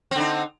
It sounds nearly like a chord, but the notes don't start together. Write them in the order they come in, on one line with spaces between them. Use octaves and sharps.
C4 D3 D#4